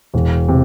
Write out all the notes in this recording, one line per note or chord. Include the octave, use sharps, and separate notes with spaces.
E1
C3